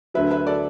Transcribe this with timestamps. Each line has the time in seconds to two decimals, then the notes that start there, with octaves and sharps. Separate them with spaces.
0.14 D2 D3 F#3 B4 E5
0.31 B4 E5
0.47 A4 D5